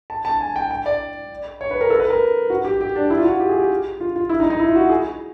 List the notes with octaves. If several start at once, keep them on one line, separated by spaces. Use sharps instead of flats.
A5
A5
G#5
G5
G5
D5
C#5
B4
A#4
A4
B4
A#4
F#4
G4
G4
D4
E4
F4
F#4
G4
G#4
G4
F4
F4
E4
D#4
D#4
E4
F4
F#4
G#4